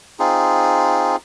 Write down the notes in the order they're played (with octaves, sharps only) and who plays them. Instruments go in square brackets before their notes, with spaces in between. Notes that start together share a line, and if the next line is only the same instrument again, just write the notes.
[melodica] C4 D#4 F4 G#4